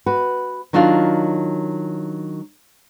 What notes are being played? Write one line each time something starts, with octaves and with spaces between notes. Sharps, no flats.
F#4 B4
D#3 F#3 D4 D#4 F4 A#4